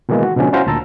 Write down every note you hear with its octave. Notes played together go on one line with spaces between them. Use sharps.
B2 D#3 E3 G#3 A#3
F#4
B2 D3 F3 G#3 C#4
C#4 E4 F#4 C5 F5 A#5
D2 A#2 A5 A#5 E6